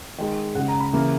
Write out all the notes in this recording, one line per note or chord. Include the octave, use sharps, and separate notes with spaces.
D#3 G#3
C#3 G#3 F#5
A#5
B5
C#3 E3 A#3